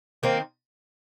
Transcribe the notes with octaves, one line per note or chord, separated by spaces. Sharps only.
D#3 A#3 C4